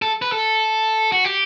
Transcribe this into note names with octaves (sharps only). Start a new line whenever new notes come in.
A4
B4
A4
F#4
G4